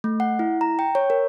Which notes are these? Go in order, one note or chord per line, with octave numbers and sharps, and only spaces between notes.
A3
F#5
E4
A#5
G5
C#5
A#4